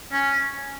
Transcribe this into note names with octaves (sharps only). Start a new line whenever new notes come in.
C#4